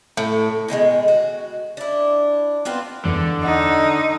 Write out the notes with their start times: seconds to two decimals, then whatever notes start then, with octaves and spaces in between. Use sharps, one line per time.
0.17 A2
0.68 B2 D#3 G3 G#3
1.08 F#4
1.77 D4 E4
2.65 B3 C4 F4 B4
3.05 E2 D3
3.43 D#4 F#5